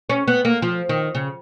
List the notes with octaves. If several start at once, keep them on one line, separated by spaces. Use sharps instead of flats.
C#4
B3
A#3
F3
D#3
C#3